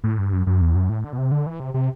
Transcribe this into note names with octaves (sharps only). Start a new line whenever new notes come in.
A2
G2
F#2
F#2
E2
F#2
A2
D3
B2
C3
D3
E3
C3
C3